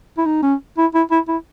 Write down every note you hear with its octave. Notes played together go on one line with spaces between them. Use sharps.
E4
D#4
C#4
E4
E4
E4
E4